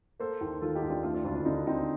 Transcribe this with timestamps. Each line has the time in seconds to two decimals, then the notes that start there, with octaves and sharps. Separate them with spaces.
0.20 A#3 A4 C5
0.41 D#2
0.61 D#3 F4 A4
0.75 D#4 G4
0.82 D#2
0.90 D4 F4
1.03 A3 D4 F4
1.14 D4 F4
1.24 D2 D4 F4
1.35 D4 F4
1.45 D3 D#4
1.67 C4 D#4